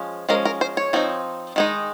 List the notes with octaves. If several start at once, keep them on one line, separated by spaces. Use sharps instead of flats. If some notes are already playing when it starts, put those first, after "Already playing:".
Already playing: F3 G#3 C#4
F3 G#3 C#4 A#4
A#4
C5
C#5
F3 C4 D#4
D#3 G#3 D#4